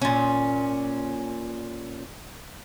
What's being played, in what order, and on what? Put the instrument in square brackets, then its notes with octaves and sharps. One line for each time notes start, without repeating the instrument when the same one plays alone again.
[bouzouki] A#2 C#4